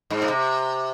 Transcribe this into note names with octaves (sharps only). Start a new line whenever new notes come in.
G#2
A#2
C3